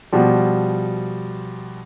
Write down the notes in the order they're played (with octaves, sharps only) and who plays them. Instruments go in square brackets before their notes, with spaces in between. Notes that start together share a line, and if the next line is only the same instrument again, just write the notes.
[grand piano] B2 F3 G3